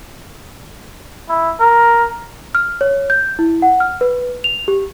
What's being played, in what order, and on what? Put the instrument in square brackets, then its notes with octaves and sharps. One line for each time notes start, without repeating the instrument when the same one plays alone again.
[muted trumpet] E4
A#4
[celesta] F6
C#5
G6
E4
F#5
F6
B4
F7
G4